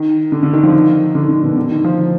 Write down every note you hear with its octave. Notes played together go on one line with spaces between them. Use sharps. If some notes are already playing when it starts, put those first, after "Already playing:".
Already playing: D#3
D3
D3
D#3
F3
D#3
D3
D#3
D3
B2
D3
D#3
F3